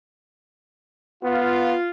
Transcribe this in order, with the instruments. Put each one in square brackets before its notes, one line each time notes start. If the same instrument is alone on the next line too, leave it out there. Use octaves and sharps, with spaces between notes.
[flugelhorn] B3 [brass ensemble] F4